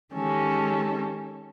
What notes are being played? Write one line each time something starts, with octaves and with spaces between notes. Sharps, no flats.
D#3 G#3 C#4 G4 A4